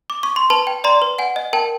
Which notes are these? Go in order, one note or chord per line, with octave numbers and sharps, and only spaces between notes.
D6
C#6
C6
B4 A5 B5
G5
D5 A#5 C6
B4
F#5 G#5
D#5
A#4 G5 A5